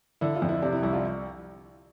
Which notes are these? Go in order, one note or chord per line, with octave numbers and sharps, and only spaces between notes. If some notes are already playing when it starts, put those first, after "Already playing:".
D3 E4
F4
F2
E4
C3 D4
E4
C2 E4
F4